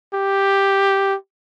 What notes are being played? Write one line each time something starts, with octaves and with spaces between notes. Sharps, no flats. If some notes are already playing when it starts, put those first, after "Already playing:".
G4